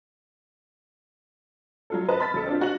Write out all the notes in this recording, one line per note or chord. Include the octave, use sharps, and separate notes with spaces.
F#3 F4 A4
B4 D#5 A5
B5 F6 A6 B6
B1 A4 A5
C4 D4 F4
D4 F#4 F#6 F#7